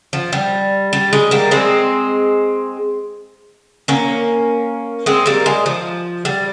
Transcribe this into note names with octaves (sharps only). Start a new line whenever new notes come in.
F3
G3
G3
G#3
G3 A#3
G#3 C4
A#3 C#4
G#3 C4
G3 A#3
G#3
F3
G3